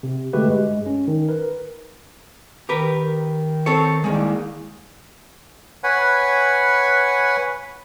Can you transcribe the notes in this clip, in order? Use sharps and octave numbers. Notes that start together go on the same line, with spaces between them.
C3
D3 G#3 A3 F#4 G4 B4
G2 G#3
C#4
D#3
A#4 B4
D#3 G4 A#4 B4
C4 A4 C#5
C2 D#3 G#3 A#3
B4 C#5 F#5 G#5 B5